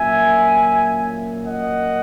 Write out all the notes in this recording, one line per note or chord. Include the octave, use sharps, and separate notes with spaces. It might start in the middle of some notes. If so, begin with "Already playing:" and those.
Already playing: A#2 F#3 A#3 C#4 E5 G#5
D#5 F#5